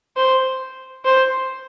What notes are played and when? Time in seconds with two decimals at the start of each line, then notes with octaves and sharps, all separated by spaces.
0.17 C5
1.05 C5